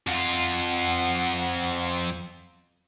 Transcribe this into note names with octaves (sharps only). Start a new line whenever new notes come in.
F2 F4 F#5